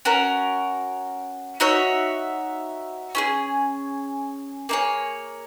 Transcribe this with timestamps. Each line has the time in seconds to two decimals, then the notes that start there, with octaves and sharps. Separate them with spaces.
0.05 C#4 F#4 A#4
1.60 D#4 F#4 C#5 E5
3.15 C#4 E4 G#4
4.69 A#3 D#4 G#4 C#5